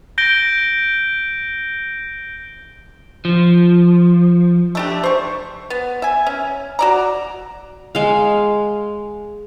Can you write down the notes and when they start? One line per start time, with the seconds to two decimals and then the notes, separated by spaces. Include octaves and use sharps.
0.18 G6 A#6 D7 G7
3.25 F3
4.75 A3 D4 G4
5.03 C5 C#6
5.70 B3
6.02 E5 G#5
6.27 C#4
6.79 F#4 D5 A#5
7.95 G#3 F5